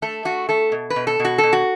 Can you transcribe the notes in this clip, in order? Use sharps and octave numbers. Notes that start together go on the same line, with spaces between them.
A3 A4
A3 F#4
A3 A4
B2
B4
B2
A4
B2
F#4
B2 A4
F#4